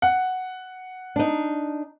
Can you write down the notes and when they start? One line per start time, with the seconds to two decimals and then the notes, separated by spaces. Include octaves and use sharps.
0.02 F#5
1.16 D4 D#4